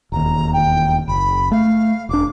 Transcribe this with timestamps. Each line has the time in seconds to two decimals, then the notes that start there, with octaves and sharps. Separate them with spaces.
0.12 E1 D#2 A#5
0.53 G5
1.08 F#1 B5
1.51 A3 F5
2.09 E1 D4 D6